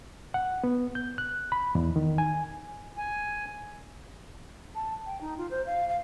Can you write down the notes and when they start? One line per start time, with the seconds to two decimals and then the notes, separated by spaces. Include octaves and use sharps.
0.34 F#5
0.64 B3
0.95 G6
1.18 F#6
1.52 B5
1.75 E2
1.96 D#3
2.18 G#5
2.97 G#5
4.75 A5
5.06 G5
5.21 D#4
5.38 F4
5.51 C5
5.66 F5
5.89 F5